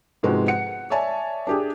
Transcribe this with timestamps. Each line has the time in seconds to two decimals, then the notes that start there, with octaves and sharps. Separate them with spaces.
0.23 G#2 C3 F3 G#3 B3 F#4
0.48 F#5 C#7
0.90 C#5 D5 E5 G#5 A5
1.47 D4 G4 G#4